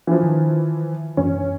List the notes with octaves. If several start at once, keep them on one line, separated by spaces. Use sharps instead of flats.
E3 F3
D#3
G1 F#2 E3 C#4